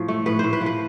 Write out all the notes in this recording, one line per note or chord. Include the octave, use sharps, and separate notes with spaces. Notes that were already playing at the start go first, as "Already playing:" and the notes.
Already playing: A2 F3
A3
A2 B4
A2 C5
B4
F3
B4